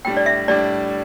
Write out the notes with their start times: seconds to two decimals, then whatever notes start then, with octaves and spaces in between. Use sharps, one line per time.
0.05 A2 G3 D4 G5
0.17 D5
0.26 E5
0.48 A2 G3 D4 D5